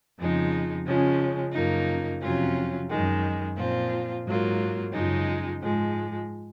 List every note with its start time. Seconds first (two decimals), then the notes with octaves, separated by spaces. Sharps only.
0.18 F2 C#3 F3 G#3 D#4
0.86 C#3 F3 G#3 C#4
1.53 F#2 C#3 F3 A#3 D#4
2.22 F2 C3 F#3 C#4 F4
2.89 F#2 D#3 G#3
3.57 A#2 F3 C4 F4
4.26 G#2 F#3 A#3 F4
4.93 F#2 C#3 F3 G#3 D#4
5.61 G#2 F3 G#3